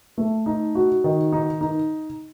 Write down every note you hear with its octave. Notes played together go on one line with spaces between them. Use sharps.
A3
D#4
F#4
D#3
D#4
D#4